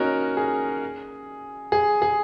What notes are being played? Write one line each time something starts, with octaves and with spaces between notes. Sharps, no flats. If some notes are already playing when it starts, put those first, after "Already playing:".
Already playing: A#3 C#4 D#4 F#4 A#4
G#4
G#4
G#4